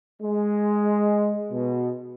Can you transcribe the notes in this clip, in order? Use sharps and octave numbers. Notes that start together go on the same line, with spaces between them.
G#3
B2